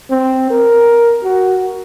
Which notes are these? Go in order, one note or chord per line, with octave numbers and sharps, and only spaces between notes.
C4
A#4
F#4